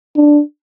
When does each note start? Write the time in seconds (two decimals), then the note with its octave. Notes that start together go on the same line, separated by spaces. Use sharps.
0.16 D4